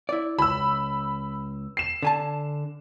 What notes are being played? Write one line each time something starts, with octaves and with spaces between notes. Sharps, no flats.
E4 D5
C#2 B5 E6
C7 E7
D3 G#5 A5